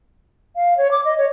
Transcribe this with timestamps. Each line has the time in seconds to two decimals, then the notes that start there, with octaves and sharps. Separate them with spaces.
0.56 F5
0.78 C#5
0.91 D6
1.05 D#5
1.18 C#5